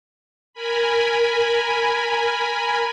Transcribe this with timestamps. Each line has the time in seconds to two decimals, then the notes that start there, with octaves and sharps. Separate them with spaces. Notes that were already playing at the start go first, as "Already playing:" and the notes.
0.53 A#4 G#5 B5